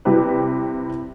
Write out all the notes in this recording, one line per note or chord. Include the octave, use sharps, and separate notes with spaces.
C3 G3 E4 G4 B4